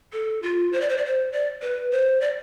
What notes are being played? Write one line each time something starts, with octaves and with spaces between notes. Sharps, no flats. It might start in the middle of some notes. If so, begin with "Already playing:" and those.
A4
F4
C5
D5
C5
D5
C5
D5
B4
C5
D5